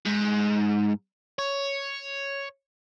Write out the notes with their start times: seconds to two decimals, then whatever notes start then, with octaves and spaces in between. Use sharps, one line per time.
0.06 G#2
1.39 C#5